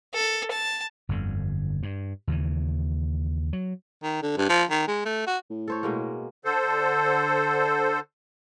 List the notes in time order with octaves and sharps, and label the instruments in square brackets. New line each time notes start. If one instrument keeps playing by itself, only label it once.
[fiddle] A4
A5
[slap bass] G1 F2 D3
G2
D#2 C#3 E3
F#3
[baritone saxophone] D#3
D3
G2
F3
D#3
G#3
A3
F#4
[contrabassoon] A2
[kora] A4 C5 C#5
B2 G#3 A#3
[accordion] D3 A4 C5